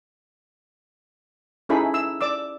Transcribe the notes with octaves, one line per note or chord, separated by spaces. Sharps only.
C#4 D#4 E4 G#4 A4 B5
E6
D5 D6 E6